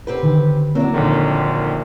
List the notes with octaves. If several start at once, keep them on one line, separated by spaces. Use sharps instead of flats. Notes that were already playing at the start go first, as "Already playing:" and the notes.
C4 G4 B4
D3 D#3
F#3 A#3 C4 D4 E4
A#1 D3 D#3